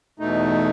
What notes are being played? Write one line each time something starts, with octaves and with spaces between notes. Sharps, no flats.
E2 B2 A3 D#4